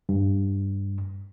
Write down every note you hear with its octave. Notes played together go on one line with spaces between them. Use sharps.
G2